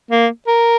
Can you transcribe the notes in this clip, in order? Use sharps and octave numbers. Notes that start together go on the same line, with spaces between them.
A#3
A#4